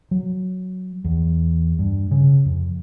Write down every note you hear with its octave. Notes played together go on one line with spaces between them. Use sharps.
F#3
E2
G2
C#3
F2